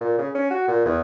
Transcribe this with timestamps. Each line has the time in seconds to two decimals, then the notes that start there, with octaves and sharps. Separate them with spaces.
0.01 A#2
0.18 C#3
0.35 C#4
0.51 F#4
0.68 A#2
0.86 E2